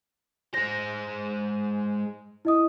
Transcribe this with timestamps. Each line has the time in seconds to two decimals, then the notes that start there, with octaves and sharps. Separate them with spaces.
0.54 G#3 C5 A#6
2.45 E4 D#5 D#6